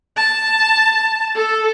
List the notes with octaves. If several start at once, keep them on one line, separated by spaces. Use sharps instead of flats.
A5
A4